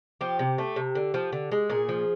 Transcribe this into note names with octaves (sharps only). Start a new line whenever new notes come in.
F3 G4
C3
A3
C3
D3
F3
D3
G#3
A#2 G#4
F3